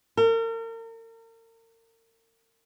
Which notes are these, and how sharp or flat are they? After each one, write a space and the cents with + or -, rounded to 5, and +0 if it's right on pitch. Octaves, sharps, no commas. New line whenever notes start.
A#4 -40